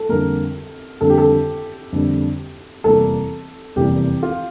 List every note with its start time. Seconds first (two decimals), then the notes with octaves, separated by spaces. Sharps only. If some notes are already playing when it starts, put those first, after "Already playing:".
Already playing: A4
0.09 F2 D3 G3 A#3 A#4
1.01 F2 D3 G3 A#3 A4
1.09 G4
1.18 A4
1.92 F2 D3 G3 A#3
2.84 F1 E2 E3 G3 A#3 A4
3.76 F1 E2 E3 G3 A#3 G4
4.23 F4